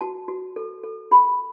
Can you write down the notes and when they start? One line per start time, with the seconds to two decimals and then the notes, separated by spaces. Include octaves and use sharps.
0.01 F#4 A5
0.28 F#4
0.56 A4
0.83 A4
1.11 G4 B5